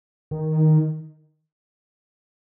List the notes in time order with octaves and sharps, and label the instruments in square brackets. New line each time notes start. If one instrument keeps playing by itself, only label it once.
[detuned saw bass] D#3